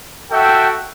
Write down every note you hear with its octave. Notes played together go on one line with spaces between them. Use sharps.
F#4 A4 E5 G5